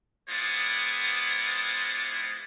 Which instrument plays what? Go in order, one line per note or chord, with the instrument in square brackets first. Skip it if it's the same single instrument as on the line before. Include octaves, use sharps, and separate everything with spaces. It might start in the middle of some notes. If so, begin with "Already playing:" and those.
[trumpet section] G#3 B3 E4 F4 C5 D5